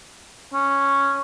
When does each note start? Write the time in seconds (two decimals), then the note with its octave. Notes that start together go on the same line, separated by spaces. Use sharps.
0.54 C#4